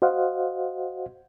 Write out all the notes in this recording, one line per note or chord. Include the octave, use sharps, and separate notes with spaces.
F#4 C5 D#5 F5 F#5